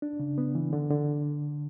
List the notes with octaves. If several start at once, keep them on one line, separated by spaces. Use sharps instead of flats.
D4
C#3
B3
E3
D3
D3